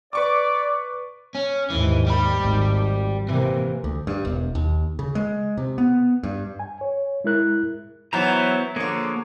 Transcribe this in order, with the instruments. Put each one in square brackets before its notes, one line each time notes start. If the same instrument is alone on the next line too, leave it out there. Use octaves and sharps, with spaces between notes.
[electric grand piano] B4 C#6 D6 [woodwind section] D5
[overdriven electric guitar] C#4
[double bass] D#2 G#2 [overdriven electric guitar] E3
[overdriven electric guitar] G3 B5
[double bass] G#1
[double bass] C3 A#3 [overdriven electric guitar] E3
[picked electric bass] D2
G2
E1
D#2
C#3
G#3
C3
B3
G2
[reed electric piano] G#5
C#5
G#3 E4 A#4 F#6
[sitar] E3 F#3 [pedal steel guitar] B3 C5 A#5
[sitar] D3 F3 [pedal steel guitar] A#3 G#4 C#5